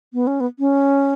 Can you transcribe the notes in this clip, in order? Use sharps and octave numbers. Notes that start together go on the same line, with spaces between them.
B3
C#4
B3
C#4